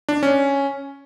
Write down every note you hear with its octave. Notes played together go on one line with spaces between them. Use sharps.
D4
C#4